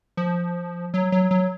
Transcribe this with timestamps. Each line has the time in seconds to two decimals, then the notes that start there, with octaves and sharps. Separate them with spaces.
0.17 F3
0.94 F#3
1.12 F#3
1.31 F#3